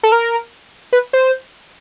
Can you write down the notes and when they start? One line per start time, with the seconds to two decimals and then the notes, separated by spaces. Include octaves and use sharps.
0.03 A4
0.12 A#4
0.93 B4
1.13 C5